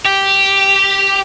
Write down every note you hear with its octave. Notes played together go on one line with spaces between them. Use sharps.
G4